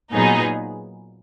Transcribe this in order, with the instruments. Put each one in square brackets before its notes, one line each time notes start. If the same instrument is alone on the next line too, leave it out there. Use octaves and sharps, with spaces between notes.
[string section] A#2 F#3 B3 D#4 G#4